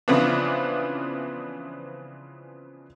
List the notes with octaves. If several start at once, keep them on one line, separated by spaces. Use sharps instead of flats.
C#3 E3 F3 B3 C4 D4